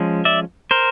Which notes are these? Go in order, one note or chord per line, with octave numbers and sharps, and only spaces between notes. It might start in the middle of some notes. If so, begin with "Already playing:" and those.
Already playing: F3 G#3 C#4
D5 E5
A#4 C5